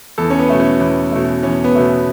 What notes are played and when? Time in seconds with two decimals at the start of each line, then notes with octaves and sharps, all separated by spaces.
0.18 E2 A4
0.30 C#4
0.39 B3
0.49 B2 A3
0.60 C#4
0.80 E2
1.12 B2 A3
1.43 E2 C#4
1.64 B3
1.75 B2 A3